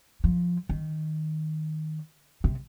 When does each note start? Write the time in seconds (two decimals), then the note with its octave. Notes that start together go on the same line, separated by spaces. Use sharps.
0.24 F3
0.69 D#3
2.44 C3